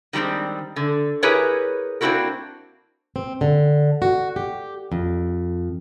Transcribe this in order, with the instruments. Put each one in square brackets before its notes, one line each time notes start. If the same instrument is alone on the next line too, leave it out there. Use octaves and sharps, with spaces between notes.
[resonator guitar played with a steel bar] D#3 G3 G#3 C4 D4
D3
E4 G4 G#4 A#4 B4 C#5
A#3 C4 D4 E4 F#4 A#4
[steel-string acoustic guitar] C4
D3
F#4
G4
F2